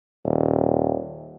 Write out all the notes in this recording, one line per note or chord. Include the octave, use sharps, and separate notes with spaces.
D#1